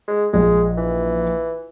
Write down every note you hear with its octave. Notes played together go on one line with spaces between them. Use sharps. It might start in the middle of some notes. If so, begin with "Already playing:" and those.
G#3
A#1 G#3 D#5
E3